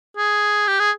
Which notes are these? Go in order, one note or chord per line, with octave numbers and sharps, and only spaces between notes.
G#4
G4
G#4